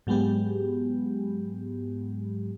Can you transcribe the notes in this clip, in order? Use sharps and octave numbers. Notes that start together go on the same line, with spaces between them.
G#2 F#3 G#3 B3 G4